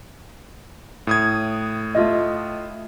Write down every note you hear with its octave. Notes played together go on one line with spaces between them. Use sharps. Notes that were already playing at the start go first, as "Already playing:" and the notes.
A2 D#6 G#6
A3 F4 D#5